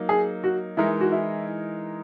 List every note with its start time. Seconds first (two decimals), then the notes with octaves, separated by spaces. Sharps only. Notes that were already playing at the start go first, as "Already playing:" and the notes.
Already playing: F#3 A#3 D#4
0.09 G#4
0.44 F#4
0.77 E3 G#3 D#4 E4 A#4
1.01 F#4
1.12 E4